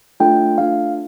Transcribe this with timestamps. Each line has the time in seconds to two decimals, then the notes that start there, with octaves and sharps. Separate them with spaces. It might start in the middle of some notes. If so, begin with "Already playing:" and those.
0.20 A3 D4 F4 A4 G5
0.58 A3 D4 F4 A4 F5